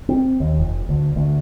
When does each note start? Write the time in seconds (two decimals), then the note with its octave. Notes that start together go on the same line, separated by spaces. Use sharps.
0.09 C4
0.40 D#2
0.58 F1
0.89 D2
1.16 D2